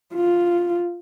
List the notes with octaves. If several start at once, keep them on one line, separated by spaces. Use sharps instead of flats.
F4